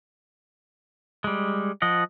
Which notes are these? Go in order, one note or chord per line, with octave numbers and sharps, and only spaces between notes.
G3 G#3
F3 D#5 F#5